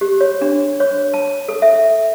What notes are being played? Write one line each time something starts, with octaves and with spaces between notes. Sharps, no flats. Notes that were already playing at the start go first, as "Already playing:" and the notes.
G4
C#5
D4
C#5
A5
A4
E5